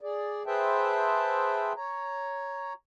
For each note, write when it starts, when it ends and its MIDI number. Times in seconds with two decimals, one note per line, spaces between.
0.01 0.43 68
0.01 0.43 74
0.47 1.73 68
0.47 1.73 71
0.47 1.73 72
0.47 1.73 76
0.47 1.73 79
0.47 1.73 81
1.77 2.73 73
1.77 2.73 82